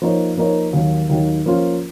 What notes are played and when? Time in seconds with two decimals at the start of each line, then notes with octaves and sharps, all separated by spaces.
0.02 F3 A#3 D#4 A#4 C#5
0.37 F3 A#3 D#4 A#4 C#5
0.73 D#2 D#3 F#3
1.09 D#2 D#3 F#3
1.46 F3 A#3 C#4 F4